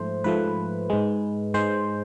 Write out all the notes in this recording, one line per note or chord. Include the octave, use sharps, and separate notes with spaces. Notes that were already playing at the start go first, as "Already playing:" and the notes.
Already playing: G#2 F3 A3 C5
G#2 F3 A3 B4
G#2 G#3
G#2 G#3 C5